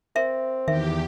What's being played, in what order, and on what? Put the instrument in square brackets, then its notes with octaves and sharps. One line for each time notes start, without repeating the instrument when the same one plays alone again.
[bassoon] C4 [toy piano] A#4 E5
[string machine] E2 G4 [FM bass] D#3 [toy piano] E5